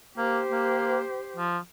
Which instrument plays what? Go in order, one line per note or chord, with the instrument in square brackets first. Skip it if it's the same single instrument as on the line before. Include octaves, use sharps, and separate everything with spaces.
[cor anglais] A#3 [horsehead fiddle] G4 C5
[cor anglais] A#3
F3